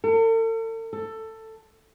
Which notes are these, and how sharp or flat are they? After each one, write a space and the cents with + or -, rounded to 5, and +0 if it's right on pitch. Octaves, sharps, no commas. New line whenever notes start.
A4 +45
A4 +15